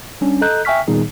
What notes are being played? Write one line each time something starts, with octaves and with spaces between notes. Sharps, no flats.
G3 C#4 D4
A4 D#5 A#5 F#6 G6
E5 G5 G#5 C#6 F6 B6
A#2 D#3 G3 B3 D#4 G#4